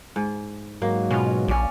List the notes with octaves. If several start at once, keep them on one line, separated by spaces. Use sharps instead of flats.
G#2
G#2 F#3 A#3
B2 C#4 F4
A#1 C#4 D5